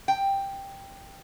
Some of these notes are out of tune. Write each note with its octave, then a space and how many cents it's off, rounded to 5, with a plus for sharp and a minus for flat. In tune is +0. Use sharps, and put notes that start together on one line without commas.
G5 +5